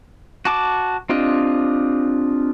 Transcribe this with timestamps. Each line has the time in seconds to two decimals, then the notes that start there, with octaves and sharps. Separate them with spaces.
0.45 F#4 A5 D6
1.09 C4 D4 F4 G4 D#5